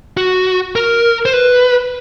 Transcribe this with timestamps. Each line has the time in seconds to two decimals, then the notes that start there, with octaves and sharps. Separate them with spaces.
0.17 F#4
0.76 A#4
1.25 C5
1.33 B4